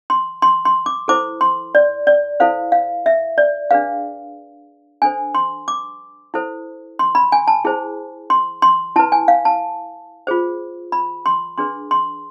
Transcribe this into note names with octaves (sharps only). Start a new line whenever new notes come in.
C6
C6
C6
D6
E4 A4 C5 D6
C6
D5
D5
E4 A4 C5 F5
F5
E5
D5
D4 G#4 B4 F5
D4 A4 C5 G#5
C6
D6
E4 A4 C5
C6
B5
G#5
A5
E4 G#4 C5
C6
C6
E4 B4 A5
G#5
F5
A5
F4 G#4 C5
B5
C6
D4 G#4 B4 C6
C6